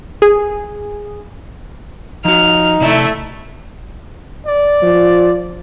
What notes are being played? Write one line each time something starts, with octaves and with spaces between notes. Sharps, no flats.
G#4
F3 D#4 F#4 F6
C3 A3 E4 D5 A5
D5
F3